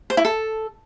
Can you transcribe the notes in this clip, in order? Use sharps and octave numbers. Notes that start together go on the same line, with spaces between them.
C5
E4
A4